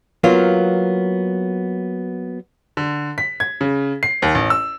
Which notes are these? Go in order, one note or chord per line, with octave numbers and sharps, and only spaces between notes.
F#3 A#3 B3 F4
D3
B6
G#6
C#3
C7
D#2
A1
E6